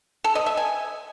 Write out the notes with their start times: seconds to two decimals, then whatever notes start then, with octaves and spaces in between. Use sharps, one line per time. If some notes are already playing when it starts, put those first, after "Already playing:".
0.24 A4
0.35 D#5
0.46 E5
0.57 G#5